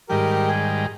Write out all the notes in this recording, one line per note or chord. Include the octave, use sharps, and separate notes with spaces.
G#2 D#3 G3 G4 A#4
G#4